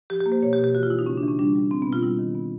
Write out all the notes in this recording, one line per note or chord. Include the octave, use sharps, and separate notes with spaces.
F3 G4
G4
A#3
C5
B2 C#5
G4
B2
G4
E3 F#4
F4
G#3 E4
D#4
C#3 C#4
D4
E3
C#4
G3 D4
G3
B2 C4
B3
B2 F4
G3 E4
D#3
B3